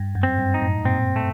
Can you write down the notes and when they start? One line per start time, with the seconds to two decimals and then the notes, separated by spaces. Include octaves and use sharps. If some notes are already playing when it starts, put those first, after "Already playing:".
Already playing: G2
0.15 F#2
0.23 C4
0.39 G2
0.54 D#4
0.62 F#2 A2
0.85 G2 A#2 C4
1.16 A3